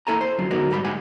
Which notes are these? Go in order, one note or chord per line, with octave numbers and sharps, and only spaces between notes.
A#3 E4 A4 G#5 A#5
C5
F#2 D3 F#3 F4
D3 G#3 B3 D#4 F#4 A#4
G#2 G3 A#5 B5
G#3 G4 F#5 G#5